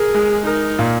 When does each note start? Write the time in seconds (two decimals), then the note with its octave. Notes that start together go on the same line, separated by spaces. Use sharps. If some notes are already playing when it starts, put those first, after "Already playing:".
Already playing: G#4 A#4
0.15 G#3
0.46 D#4 A#4
0.79 A#2